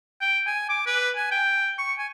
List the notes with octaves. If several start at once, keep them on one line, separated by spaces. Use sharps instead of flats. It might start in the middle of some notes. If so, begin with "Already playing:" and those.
G5
G#5
D6
B4
G#5
G5
C#6
G#5